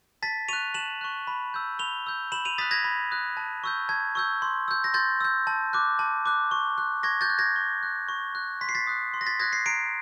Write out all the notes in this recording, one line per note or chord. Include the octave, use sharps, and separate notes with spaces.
A5 A6 B6
C#6 F#6 D#7 F7
A5 E7 F#7
C#6 F#6
B5
E6 G6
B5 F7 G7
E6 G6
B5 E7 F#7
D#7 F7
D#6 F#6 A6 B6
G#6 A#6
B5
D#6 F#6
A5
C#6 E6 G6
A5 G#6
C#6 E6 G6
C6
E6 G6
A#6
C6 G6 A6
E6 G6
A5
D6 F#6
A5
D6 F#6
C#6
F#6
C#6 G#6 A#6
G6 A6
F#6
G#6 A#6
C#6
F#6
C#6
F#6
C6 B6
C7
A6 B6
D#6 F#6
C6
A#6
A6 B6
D#6 F#6 G#6 A#6
A#6 C7
A#5 C7 D7